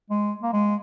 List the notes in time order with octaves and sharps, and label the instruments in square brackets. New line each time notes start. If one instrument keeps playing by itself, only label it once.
[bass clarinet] G#3
A#3
G#3